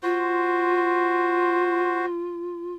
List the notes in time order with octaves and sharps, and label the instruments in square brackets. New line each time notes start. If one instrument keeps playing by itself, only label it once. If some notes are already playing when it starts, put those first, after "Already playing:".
[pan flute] F4 [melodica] F#4 C5